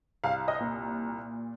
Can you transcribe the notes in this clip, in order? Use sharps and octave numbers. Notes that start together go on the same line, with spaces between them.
C2 F5
D#5
A#2